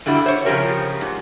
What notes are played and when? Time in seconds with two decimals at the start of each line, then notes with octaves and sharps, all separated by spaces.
0.06 G2 D3 G3 E4 F#4
0.26 C5 C#5
0.45 C#3 F3 G#3 G4 A#4 C#5
1.01 G#2